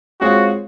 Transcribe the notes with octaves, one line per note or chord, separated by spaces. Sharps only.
G#3 C4 F4 F#4 G#4 C#5